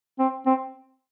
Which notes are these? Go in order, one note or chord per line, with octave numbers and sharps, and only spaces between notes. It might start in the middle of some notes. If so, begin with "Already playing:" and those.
C4
C4